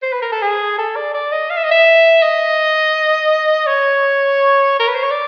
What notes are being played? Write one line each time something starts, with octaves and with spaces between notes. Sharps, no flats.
C5
B4
A#4
A4
G#4
A4
D5
D5
D#5
F5
E5
D#5
E5
D#5
C#5
A#4
B4
C5
C#5
D5